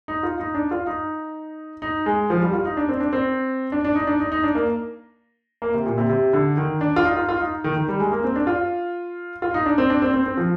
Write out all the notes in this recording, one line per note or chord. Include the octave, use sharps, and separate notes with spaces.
D#4
F4
D#4
D4
F4
D#4
D#4
G#3
F3
G3
F4
D#4
D4
C4
D4
C4
D4
D4
D#4
D4
D#4
D#4
D4
A#3
A#3
C3
A#2
C3
C3
D3
D#3
D4
F4
D#4
F4
F4
D#4
D#3
D#3
G3
G#3
A#3
C4
D4
F4
F4
D#4
D4
C4
D4
C4
C4
C4
F3